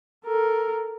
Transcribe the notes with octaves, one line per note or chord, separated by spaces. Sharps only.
A4 A#4